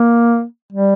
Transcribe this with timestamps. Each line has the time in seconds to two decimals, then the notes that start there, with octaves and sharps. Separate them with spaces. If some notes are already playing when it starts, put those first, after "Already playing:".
Already playing: A#3
0.73 G3